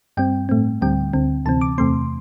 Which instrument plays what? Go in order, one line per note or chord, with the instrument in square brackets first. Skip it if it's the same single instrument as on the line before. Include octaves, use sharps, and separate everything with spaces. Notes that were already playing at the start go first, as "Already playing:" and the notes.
[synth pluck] G2 G3 C4 G5
A2 A3 C4
D2 D3 G3 C4 G5
D2 D3 C4
D2 C3 E3 C4 A5
D6
E2 C3 A3 C4 C6